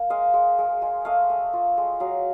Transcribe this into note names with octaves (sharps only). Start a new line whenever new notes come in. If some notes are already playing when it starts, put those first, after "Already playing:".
Already playing: A#3
G#3 D#5 F5
G#3
G#3
G#3
A3 D#5 F5
A3
F4
G#3
F#3 D#5 F5